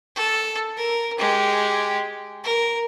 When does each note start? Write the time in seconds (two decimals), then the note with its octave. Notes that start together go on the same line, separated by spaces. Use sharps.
0.15 A4
0.77 A#4
1.18 G#3 G4
2.44 A#4